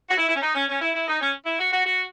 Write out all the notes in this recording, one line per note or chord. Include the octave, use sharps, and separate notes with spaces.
F#4
E4
E4
C#4
D#4
C#4
C#4
E4
E4
D#4
C#4
E4
F#4
F#4
F#4